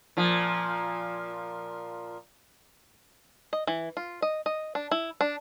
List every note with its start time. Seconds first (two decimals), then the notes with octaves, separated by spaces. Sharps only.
0.17 A#2 F3
3.53 D#5
3.67 E3
3.97 F4
4.22 D#5
4.46 D#5
4.75 D4
4.91 E4
5.21 D4